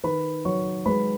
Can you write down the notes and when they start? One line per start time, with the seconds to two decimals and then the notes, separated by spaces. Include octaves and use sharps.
0.04 D#3 B4 B5
0.45 F#3 C#5 C#6
0.86 G#3 B4 B5